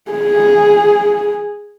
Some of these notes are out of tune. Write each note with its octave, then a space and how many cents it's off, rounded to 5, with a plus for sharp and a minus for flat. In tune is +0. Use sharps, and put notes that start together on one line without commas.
G#4 -5